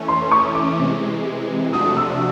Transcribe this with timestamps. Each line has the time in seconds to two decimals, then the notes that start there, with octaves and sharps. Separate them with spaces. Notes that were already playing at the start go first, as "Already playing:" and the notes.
Already playing: E3 A3 C#4
0.08 C6
0.31 C#6
0.55 D6
0.79 C3 E3 G#3
1.73 C3 F3 A3 D4 F#4 D#6
1.97 E6